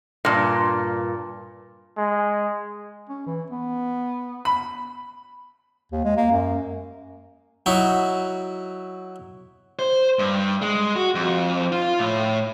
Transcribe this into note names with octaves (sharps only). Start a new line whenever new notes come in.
G2 A#2
G#3
C#4
E3
B3
B5
D#2
G#3
A#3
F#2
F#3 D#4 E4 F#4
C5
G2
G#3
F#4
F2
F4
A2